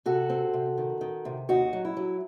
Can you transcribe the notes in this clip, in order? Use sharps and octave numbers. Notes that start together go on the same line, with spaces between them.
C3 F#4 A4
C4
C3
D#3
D#3
C3
D#2 D#4 F#4
F#3
E4
F#3